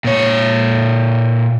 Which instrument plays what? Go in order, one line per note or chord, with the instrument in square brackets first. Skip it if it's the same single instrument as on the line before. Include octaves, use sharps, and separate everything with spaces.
[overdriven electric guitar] A#2 C#5